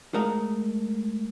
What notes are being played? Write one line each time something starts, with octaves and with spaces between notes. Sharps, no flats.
G#3 A3 A#4 D#5 F5 F#5